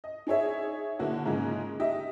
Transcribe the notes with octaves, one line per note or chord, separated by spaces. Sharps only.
D#5
D#4 G#4 C#5 E5
D3 A#3 E4 F#4
G#2 C#3 F3 G#3 A#3
D#4 G4 D#5 E5